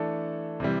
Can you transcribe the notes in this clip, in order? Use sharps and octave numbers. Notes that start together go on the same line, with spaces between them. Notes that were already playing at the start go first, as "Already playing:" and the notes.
Already playing: E3 A3 D4 A4
C3 E3 G3